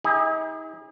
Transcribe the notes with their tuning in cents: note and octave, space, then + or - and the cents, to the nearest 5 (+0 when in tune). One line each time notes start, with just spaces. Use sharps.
D#4 +45 G#4 -35